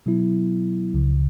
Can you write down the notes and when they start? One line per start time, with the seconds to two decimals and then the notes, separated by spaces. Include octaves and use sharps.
0.06 B2 F#3 B3 E4
0.94 C#2 C#3 F3